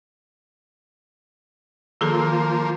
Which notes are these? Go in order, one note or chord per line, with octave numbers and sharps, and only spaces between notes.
D#3 F3 A#3 G#4 A4